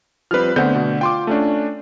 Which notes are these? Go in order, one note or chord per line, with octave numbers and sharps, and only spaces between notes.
F3 G3 C4 B4 F6
D3 A3 B3 C4 F#5 G6
B2
F4 G5 C6 D6
A3 C#4 D4